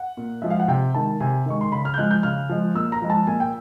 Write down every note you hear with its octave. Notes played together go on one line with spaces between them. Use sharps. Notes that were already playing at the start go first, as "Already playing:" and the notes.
Already playing: F#5
A#2
F3 G#3 E5
F5
F#5
C3 G5
D#3 G#3 A5
C3 G#5
D#3 G#3 C#6
C6
C#3 B5
F6
G6
F3 G#3 F#6
G6
C#3 F6
F3 G#3
A#2 E6
A#5
F3 G#3
A5
A#2 G#5
G5